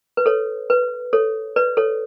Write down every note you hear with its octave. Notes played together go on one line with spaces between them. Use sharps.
B4
A4 C#5
B4
A4 C#5
B4 D5
A4 C#5